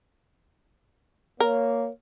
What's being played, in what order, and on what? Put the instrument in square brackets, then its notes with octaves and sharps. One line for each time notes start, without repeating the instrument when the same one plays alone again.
[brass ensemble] A#3 C#5 [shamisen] A#4